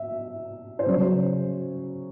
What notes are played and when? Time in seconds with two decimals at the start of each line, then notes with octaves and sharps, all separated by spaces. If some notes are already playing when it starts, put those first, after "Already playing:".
Already playing: E5
0.79 C5
0.86 C#3 F#3 C#5